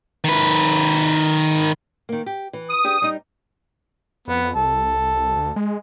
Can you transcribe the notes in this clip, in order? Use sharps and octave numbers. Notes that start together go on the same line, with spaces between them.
D#3 B4
D#3 A#3
G4
E3
D#6
D4 G4 G#4
G3 D#4
F2 B3
C2 A4
D2
G#3